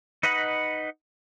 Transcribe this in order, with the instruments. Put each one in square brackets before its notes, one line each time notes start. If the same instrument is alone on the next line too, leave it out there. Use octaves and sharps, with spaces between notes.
[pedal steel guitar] D#4 B4 D#5 F#5 B5